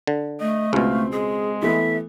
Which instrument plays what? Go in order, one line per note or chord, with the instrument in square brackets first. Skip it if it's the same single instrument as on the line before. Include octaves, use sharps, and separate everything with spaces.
[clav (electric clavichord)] D3
[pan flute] A3 [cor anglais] D#5
[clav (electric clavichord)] C#2 B2 [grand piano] C4 [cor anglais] F5
[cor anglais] G#3 [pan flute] G#4
[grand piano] E3 A3 B3 [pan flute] E5